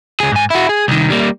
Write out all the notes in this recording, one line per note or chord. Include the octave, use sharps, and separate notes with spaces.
C#2 G#4
G#2 G#5
E4 F#4
G#4
C2 D#3
G3 A#3